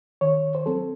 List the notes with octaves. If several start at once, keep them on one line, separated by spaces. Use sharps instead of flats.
D#3 C#5
C5
F#3 C4 A4